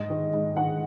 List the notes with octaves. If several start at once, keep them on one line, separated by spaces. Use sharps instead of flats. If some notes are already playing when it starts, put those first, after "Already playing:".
Already playing: G#2 D#5
D#3
G#2
D#3 F#5